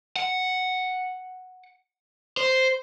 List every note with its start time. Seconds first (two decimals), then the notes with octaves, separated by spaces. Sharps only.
0.16 F#5
2.37 C5